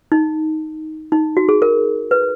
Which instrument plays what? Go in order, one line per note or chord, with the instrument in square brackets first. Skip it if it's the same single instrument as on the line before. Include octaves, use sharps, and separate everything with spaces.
[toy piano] D#4
D#4
F#4
G#4
A#4
B4